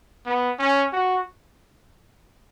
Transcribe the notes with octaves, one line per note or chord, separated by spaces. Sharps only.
B3
C#4
F#4